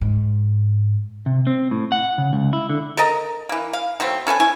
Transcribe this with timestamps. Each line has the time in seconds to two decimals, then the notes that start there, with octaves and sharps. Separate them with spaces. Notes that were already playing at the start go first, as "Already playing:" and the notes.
0.01 G#2
1.26 C3
1.47 C4
1.71 A2
1.92 F#5
2.18 C#3
2.33 C#2
2.53 E4
2.69 D3
2.97 A4 A#4 D#5 A#5
3.49 E3 A#3
3.73 F5
4.00 B2 F#3 A3 C4
4.27 C#4 A4 B4 G#5
4.40 E4 G#5 C#6